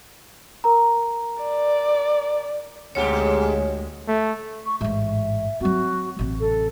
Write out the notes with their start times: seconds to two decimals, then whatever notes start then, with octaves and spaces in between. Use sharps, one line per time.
0.64 A#4 A#5
1.42 D5
2.95 D2 G#2 B2 G#3 G4 C#5
4.08 A3
4.65 C#6
4.81 A1 G#2 E5
5.60 F#3 C4 F#4
6.19 A1 C3
6.39 A4